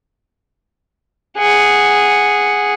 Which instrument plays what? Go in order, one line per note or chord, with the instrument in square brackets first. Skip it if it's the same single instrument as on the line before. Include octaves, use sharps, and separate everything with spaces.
[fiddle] G#4 F#5